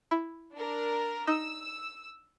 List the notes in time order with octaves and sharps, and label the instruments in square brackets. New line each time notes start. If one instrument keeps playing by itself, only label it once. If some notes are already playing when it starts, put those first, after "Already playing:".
[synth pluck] E4
[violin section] D4 A#4
[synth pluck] D#4 [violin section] E6